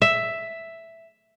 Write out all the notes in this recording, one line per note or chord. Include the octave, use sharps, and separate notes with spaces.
E5